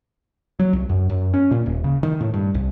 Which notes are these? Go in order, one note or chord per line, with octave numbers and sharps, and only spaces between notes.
F#3
C2
F#2
F#2
C#4
A#2
D#1
C#3
D#3
A2
G2
C2